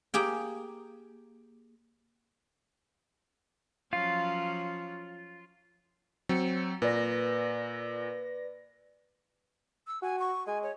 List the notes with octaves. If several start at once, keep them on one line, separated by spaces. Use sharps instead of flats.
A#3 G4 G#4 G5
F3 F#3 C#4 F4 F5
F#3 C4 C#7
A#2 B4 D5 A#6
E6
F#4 G#5
C#6
G#3 G#5
C#5